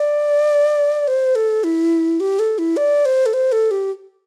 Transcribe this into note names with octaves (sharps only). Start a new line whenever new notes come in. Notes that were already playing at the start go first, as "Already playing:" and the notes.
Already playing: D5
C5
A4
E4
G4
A4
E4
D5
C5
A4
C5
A4
G4